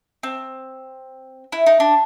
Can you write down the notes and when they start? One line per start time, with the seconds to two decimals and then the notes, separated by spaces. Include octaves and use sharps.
0.23 C4
1.52 E4
1.66 D#4
1.80 D4